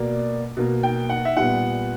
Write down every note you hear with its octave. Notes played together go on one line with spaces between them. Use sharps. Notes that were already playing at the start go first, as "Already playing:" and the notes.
Already playing: B2 A#3 D5
B2 A#3
G5
F#5
E5
A#2 G3 B3 F#5